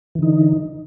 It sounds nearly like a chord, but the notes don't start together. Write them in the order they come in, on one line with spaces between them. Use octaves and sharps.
E3 D3 D#4